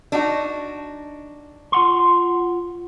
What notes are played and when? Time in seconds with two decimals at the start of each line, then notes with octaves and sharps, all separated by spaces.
0.12 D4 D#4 F#4
1.72 F4 F#5 C6